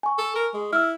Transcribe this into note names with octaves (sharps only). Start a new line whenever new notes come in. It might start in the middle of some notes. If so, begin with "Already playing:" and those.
G#5 C#6
A4
A#4
G#3
E4 E6 F6